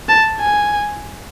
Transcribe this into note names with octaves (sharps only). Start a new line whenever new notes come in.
A5
G#5